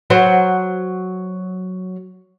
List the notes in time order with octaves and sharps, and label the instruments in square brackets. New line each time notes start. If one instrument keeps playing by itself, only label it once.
[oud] F#3 F#4 C5